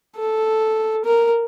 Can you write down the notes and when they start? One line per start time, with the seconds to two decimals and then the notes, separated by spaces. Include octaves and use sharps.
0.17 A4
1.05 A#4